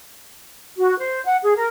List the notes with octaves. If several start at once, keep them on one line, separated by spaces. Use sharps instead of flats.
F#4
C5
F#5
G#4
A#4